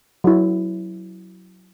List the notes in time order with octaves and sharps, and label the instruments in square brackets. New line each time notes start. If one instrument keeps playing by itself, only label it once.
[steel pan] F#3 E4